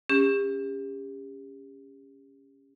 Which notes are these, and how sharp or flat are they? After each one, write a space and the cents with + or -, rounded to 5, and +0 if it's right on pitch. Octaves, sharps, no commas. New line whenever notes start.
C#4 +0 G4 +40